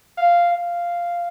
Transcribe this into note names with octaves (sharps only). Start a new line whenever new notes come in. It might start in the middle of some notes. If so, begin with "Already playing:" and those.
F5
F5